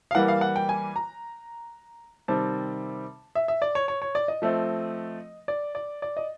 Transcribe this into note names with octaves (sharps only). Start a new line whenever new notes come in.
F5
E3 G3 A#3 F#5
F5
F#5
G5
G#5
A#5
C3 D#3 G3 C4 A5
E5
E5
D5
C#5
C#5
C#5
D5
D#5
F3 A3 C4
D5
D5
D5
D#5